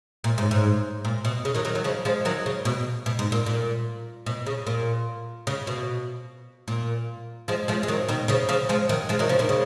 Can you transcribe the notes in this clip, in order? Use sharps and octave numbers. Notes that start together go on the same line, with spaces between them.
A#2
G#2
G#2
A#2
B2
C#3
D#3 F#3
D#3 F#3
D#3 F#3
C#3 F3
F3 G#3
D#3 F#3
C#3
B2
B2
G#2
A#2
A#2
B2
C#3
A#2
C#3
B2
A#2
F3 G#3
F3 G#3
G#3
D#3 F#3
B2 D#3
C#3 F3
C#3 F3
F3 G#3
D#3 F#3
F3 G#3
D#3 F#3
C#3 F3
B2 D#3
C#3